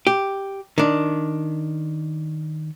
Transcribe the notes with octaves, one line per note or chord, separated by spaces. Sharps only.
G4
D#3 D4